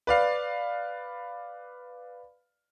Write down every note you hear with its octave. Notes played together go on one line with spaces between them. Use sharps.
B4 D5 F5